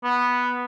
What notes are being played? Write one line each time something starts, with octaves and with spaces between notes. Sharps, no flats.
B3